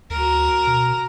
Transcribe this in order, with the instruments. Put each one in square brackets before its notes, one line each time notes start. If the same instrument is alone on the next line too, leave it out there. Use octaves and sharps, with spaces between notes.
[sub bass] D2 [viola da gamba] F#4 A#4
[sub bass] B2